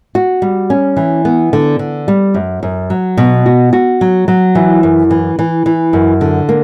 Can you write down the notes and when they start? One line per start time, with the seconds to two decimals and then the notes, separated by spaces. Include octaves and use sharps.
0.15 F#4
0.42 G3
0.70 C#4
0.97 E3
1.25 B3
1.53 D3
1.79 D3
2.08 G3
2.34 F#2
2.63 F#2
2.90 F#3
3.17 B2
3.46 F#4
3.73 F#4
4.01 F#3
4.28 F#3
4.55 E3
4.83 F#2
5.11 E3
5.39 E3
5.66 E3
5.93 F#2
6.21 D3
6.49 A#3